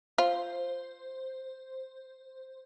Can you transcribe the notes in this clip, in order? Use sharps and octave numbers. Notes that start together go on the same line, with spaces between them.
F4 C5